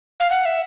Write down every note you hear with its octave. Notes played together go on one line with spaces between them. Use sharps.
F5
F#5
E5